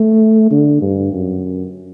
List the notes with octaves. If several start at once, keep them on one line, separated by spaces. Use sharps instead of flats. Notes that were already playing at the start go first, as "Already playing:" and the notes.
Already playing: A3
D3
G2
F#2